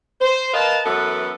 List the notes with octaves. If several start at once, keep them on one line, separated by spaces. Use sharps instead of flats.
C5
A#4 B4 D#5 F5 A5
F#2 E3 B3 A4